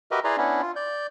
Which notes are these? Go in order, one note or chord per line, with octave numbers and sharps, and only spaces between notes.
F#4 G4 A#4 B4 D#5 E5
E4 G#4 B4 D5 A#5 C6
B3 C#4 D4 E4
F4
D5 G6